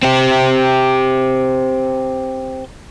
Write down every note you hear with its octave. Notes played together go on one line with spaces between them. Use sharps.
C4 G4